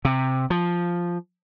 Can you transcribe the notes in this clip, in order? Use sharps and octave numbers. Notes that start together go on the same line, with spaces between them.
C3
F3